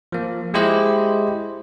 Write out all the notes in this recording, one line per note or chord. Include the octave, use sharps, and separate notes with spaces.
F3 A#3
G#3 E4 G4 C5 D#5